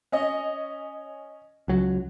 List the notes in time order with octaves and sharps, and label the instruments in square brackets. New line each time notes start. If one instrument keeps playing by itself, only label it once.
[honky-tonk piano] C#4 D#5
[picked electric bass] C#2 F#3